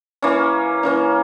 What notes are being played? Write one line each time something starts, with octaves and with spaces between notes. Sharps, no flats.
E3 A#3 C#4
E3 A#3 C#4